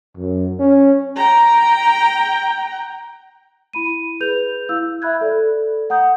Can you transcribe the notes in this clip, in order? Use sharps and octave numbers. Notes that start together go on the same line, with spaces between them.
F#2
C#4
G5 A#5
E4 B5 D#7
G#4 B4 G6 F7
E4 F5 E6 G6
E5 B5 F#6 G#6
A4 D5
F#5 A#5 D#6 G6